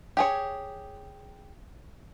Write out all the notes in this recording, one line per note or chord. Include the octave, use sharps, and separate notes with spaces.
G4 G#4 C#5